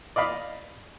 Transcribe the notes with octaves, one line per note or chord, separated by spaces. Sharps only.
D5 D#5 F5 B5